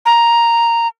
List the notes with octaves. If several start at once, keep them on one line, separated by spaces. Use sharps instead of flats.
A#5